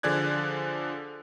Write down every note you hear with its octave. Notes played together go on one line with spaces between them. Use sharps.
D3 F3 G#4 D5 F#6 G#6